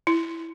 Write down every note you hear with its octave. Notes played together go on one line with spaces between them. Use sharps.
E4